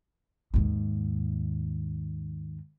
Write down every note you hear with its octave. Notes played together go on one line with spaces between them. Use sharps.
D#2 G#2